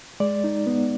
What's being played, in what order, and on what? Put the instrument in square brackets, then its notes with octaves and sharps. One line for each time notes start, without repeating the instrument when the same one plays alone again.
[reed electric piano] G#3 D5
D#4
B3